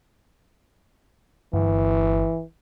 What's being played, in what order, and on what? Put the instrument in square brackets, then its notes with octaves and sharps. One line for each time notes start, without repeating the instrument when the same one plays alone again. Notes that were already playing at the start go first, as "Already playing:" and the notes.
[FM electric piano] G1 [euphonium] E3